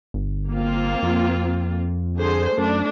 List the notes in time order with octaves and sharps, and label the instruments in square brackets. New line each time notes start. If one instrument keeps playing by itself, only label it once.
[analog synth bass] G1
[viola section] A#3 C4 F4
[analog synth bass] F2
[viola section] D3 G#4 C5
[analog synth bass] F#2 [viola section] A3 D4